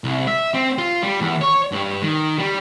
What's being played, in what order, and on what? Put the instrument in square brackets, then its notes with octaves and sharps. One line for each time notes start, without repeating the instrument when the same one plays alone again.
[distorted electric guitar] C2
E5
C4
F4
G3
E2
C#5
G2
D#3
G3